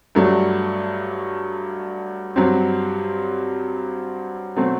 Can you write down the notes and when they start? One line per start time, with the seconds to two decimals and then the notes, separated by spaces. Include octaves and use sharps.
0.15 G2 F#3 A3 D4
2.36 G2 F#3 C4 G4
4.57 B2 F#3 A3 C4